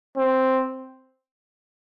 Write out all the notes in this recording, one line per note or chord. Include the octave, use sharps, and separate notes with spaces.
C4